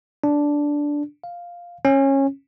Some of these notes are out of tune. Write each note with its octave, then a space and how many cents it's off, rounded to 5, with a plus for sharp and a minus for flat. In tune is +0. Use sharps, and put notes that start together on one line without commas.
D4 -5
F5 +0
C#4 -20